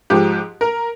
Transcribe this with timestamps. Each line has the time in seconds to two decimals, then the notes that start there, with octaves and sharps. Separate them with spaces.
0.10 G#2 F3 G#3 G4
0.61 A#4